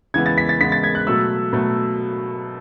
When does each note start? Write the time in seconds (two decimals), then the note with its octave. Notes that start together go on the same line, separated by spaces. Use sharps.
0.14 C#3 E3 G#3 B3 G#6
0.26 A6
0.38 B6
0.49 A6
0.60 C#3 E3 G#3 B3 B6
0.72 A6
0.84 G#6
0.95 F#6
1.07 B2 F#3 A3 E6
1.53 B2 F#3 A3